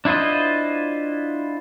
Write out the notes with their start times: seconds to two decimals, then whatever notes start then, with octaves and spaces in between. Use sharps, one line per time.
0.05 D4 E4 F4 C5 D#5